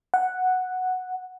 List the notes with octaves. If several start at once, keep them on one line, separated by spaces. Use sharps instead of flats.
F#5